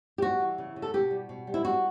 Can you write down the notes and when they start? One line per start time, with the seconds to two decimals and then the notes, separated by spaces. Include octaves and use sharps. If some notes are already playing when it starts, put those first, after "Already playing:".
0.18 G4
0.22 G3 F#4
0.40 E3
0.58 C#3
0.76 C#3
0.82 A4
0.94 B2 G4
1.11 G3
1.29 B2
1.47 G3
1.54 E4
1.64 G3 F#4